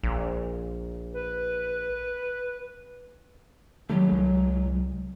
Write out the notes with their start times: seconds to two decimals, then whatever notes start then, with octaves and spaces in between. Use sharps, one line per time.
0.03 A#1
1.13 B4
3.89 D#3 F#3 G3 A3
4.09 C2 G#3